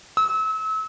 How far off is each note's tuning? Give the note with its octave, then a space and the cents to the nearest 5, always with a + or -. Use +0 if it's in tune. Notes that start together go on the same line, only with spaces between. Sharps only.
E6 -35